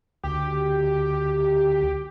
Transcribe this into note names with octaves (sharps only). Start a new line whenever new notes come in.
D2 G4